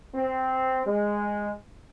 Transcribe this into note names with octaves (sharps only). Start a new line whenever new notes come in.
C4
G#3